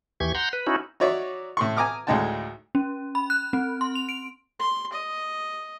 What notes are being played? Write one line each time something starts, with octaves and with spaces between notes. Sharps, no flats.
D#2 E3 G4 C#6 G#6
F#5 A#5 C6 G6
B4
C#4 D#4 E4 F#4
D#4 F#4 C#5 D5 E5
A2 C6 C#6
G#5 A#5 D6 D#6 F6
D2 A2 G#3 D#4 G5 A5
C#4
B5
F#6
C4
C6
F7
D7
C6
D#5